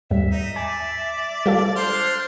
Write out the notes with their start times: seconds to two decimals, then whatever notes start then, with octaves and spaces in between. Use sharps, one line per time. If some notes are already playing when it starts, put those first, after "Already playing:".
0.11 D#2 G#2 G3 E5
0.31 D#4
0.56 D5 G#5
1.46 G3 F4 A4
1.76 D4 C5 C6 F6